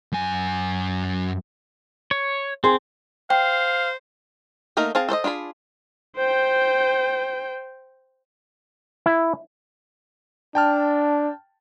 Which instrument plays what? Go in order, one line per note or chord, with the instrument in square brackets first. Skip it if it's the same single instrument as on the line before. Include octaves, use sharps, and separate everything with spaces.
[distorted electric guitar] F#2 G#5
[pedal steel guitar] C#5
[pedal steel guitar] C4 [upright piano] G#4 C6
[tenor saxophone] C5 [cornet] F5 [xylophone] G5
[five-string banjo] A3 A#3 D#4 A#4
C4 G#4 F5 A5
A4 C5 C#5 D#5
D4 F4 G#4 B5
[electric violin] C5 G5
[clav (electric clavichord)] E4
[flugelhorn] D4 [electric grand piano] G5 A5 F6